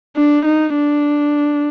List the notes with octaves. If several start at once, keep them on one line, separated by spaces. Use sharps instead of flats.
D4
D#4
D4